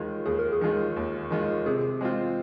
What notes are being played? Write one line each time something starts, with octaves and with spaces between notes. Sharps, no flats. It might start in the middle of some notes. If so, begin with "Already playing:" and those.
Already playing: D#2 D#3 G#3 F4
D#2 G#4
A#4
G#4
D#3 G#3 F4
D#2
D#3 G#3 F4
C3 G#4
G#3 C4 F4